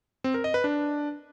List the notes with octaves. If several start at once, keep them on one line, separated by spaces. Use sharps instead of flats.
C4
A#4
D#5
B4
D4